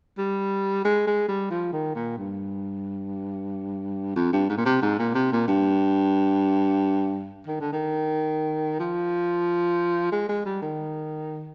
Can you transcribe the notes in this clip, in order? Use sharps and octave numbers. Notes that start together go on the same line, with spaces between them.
G3
G#3
G#3
G3
F3
D#3
A#2
G2
F2
G2
G#2
A#2
C3
G#2
A#2
C3
A#2
G2
D#3
D3
D#3
F3
G#3
G#3
G3
D#3